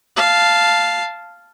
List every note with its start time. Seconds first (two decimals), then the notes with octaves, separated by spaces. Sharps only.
0.16 F5 A5